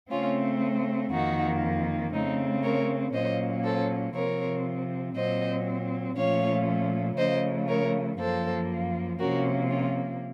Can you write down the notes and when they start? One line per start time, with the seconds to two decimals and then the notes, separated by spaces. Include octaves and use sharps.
0.11 C#3 A3 C4 C#4 F4
1.11 F2 D#3 A#3 D#4 F#4
2.13 C#3 A3 C4 D#4
2.63 A#4 C#5
3.13 A#2 F#3 A#3 C#4 C5 D#5
3.64 A4 C5
4.15 C3 F3 C4 A#4 C#5
5.15 A#2 F#3 C4 C5 D#5
6.17 A#2 F3 A3 C#4 C#5 F5
7.18 C#3 F3 A3 C5 D#5
7.69 A#4 C#5
8.19 F#2 F3 A#3 A4 C5
9.19 C3 F3 A#3 C#4 F#4 A#4
9.70 C#4 F4